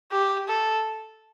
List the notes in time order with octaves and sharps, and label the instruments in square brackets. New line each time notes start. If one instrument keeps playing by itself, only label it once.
[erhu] G4
A4